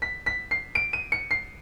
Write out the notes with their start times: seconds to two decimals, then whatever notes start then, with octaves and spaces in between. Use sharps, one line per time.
0.02 B6
0.26 B6
0.51 C7
0.75 D7
0.93 D#7
1.12 C#7
1.31 C7